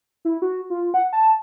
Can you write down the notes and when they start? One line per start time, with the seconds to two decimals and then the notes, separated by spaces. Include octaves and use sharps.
0.25 E4
0.42 F#4
0.70 F4
0.94 F#5
1.13 A5